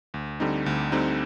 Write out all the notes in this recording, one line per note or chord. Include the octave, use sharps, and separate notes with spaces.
D2
D3 G3 C4 D#4
D2
D3 G3 C4 D#4